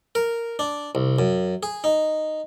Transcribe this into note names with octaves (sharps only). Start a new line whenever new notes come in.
A#4
D4
C2
F#2
G#4
D#4